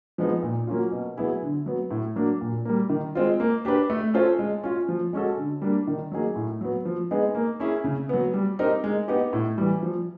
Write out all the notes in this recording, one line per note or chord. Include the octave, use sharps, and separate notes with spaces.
F3 G#3 B3 D#4
A#2
F#3 A#3 C#4 F4
B2
F#3 B3 E4 G#4
D3
F#3 B3
A2
F#3 A#3 D4
A#2
G3 A#3
D#3
G#3 C4 F4
A#3
D4 G4 B4
A3
C#4 F4 A4 C5
G#3
C#4 F4
F3
G#3 C#4 F#4 A4
D3
G3 A#3 D4
D#3
F#3 A#3 D#4 G#4
A2
F#3 B3
F3
G#3 B3 D#4 G#4
A#3
C#4 E4 G#4
C#3
F#3 B3
G3
C4 D#4 G4 A#4
G#3
B3 D#4 G4
A2
E3 G3
F3